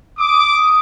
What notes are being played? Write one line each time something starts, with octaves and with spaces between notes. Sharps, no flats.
D6 D#6